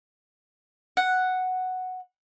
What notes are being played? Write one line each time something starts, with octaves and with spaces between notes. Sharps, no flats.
F#5